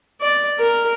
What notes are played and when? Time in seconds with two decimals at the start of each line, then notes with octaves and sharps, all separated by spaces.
0.21 D5
0.59 A#4